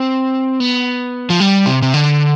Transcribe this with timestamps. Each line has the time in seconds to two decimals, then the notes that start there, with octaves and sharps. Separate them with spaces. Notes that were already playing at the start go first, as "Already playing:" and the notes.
Already playing: C4
0.60 B3
1.30 F3
1.40 G3
1.66 C3
1.82 C3
1.94 D3